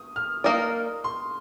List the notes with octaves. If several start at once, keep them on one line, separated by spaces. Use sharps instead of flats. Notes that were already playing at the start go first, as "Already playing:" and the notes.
Already playing: D#6
F6
A#3 D#4 A#4 D5 D#6
C6